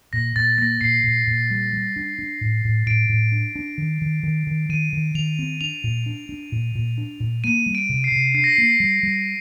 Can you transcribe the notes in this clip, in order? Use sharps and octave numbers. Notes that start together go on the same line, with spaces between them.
A#2 A#6
A#2 A6
A#3 A#6
A#2 C7
A#2
A#2
G3
G3
D4
D4
A2
A2
A2 D7
A2
D4
D4
D#3
D#3
D#3
D#3
D#3 D#7
D#3
D#3 F7
C4
D4 F7
A#2
D4
D4
A#2
A#2
D4
A#2
A#3 D#7
G3
D7
C3
C7
C3
D4 C7
A#6
C7
A#3
G3
G3